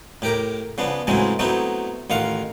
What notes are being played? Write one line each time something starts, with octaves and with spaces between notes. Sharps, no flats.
A2 G4 A#4 D6
C#3 F3 B3 D4
A2 C#3 E3 F#3 G#3 C4
F#3 A3 B3 C4 D#4 E4
A1 D#3 F4 F5 F#5